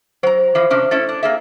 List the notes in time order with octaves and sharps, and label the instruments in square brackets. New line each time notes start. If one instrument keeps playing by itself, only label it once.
[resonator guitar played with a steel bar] F#3 A#5 [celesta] C5
[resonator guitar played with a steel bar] E3 F3
C3 C#4 D4
[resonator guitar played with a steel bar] A3 C#4 E4 [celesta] A6
[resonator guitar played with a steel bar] D4
A#3 G#4 E5